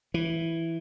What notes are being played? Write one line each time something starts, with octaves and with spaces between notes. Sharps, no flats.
E3